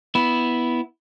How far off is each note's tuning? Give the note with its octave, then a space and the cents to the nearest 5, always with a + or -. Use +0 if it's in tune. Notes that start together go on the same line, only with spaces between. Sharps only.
B3 +0 E4 -5